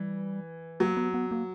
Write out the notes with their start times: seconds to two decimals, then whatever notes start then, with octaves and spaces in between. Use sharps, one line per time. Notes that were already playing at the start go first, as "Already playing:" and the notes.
Already playing: E3 G3
0.80 F#3 A#3
0.97 B3
1.14 B3
1.31 A#3